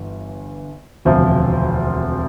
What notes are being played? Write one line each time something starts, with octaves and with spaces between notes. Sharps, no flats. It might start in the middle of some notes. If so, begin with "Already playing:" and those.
Already playing: G1 G2 E3
E1 D2 C3 F3 C5 E5